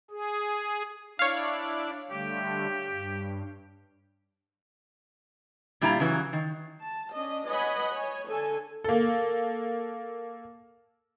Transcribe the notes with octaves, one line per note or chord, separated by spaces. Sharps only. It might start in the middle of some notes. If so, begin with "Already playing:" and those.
G#4
D4 E4 C#5 D5 F5
D3 G3 A3 G4
G2
A#2 G3 E4 F4 A#5
C#3 E3 F#3
D#3
A5
C#4 D4 D#5
B4 C#5 D#5 F#5 G#5 B5
C#5 G#5
D3 A4 G#5
A#3 A4